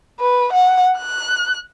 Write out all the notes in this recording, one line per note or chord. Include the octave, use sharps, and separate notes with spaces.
B4
F#5
F#6